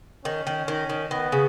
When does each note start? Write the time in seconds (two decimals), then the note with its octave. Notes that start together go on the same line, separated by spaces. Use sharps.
0.25 D#3 C#4
0.47 D#3
0.68 D#3
0.90 D#3
1.11 D#3 B3
1.32 C#3